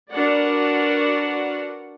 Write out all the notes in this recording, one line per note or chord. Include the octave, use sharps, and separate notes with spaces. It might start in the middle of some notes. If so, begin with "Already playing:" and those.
D4 F#4 A#4 B4 D5 F#5